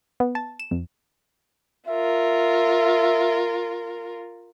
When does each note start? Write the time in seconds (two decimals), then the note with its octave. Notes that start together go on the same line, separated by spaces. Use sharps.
0.20 B3
0.35 A5
0.60 E7
0.71 F2
1.88 F4 A#4 E5